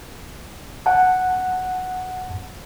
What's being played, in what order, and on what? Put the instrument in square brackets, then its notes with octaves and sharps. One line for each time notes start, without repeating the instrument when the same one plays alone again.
[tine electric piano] F#5 A5